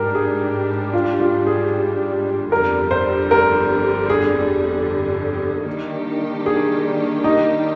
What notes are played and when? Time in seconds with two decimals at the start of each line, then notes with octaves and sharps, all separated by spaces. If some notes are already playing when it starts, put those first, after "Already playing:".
Already playing: G#2 G3 D4 G4 A#4
0.15 G#4
0.93 F4
1.20 F4
1.47 G#4
2.52 G1 F2 D3 G3 A#4
2.91 C5
3.31 A#4
4.10 G#4
5.67 D#3 G3 A#3 D4 G4
6.46 G#4
7.24 D#4